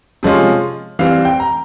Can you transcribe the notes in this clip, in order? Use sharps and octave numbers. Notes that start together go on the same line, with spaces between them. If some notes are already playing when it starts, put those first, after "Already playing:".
C3 F3 G#3 C#4 F4
E3 G3 C4 F5
G5
A#5